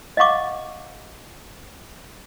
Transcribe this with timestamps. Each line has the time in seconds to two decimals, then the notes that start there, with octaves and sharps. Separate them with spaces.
0.17 D#5 F5 F#5 C#6 D6